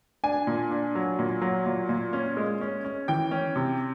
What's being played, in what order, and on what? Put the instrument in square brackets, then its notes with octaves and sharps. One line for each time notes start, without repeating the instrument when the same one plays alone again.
[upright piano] D4 G#5
A#2
D4
F#3
A#2
F#3
A#2
A#2
C#4
G#3
C#4
C#4
E3 G5
C#4
C3